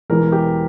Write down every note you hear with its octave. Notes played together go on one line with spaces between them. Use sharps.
E1 E2 E3 A#4
G4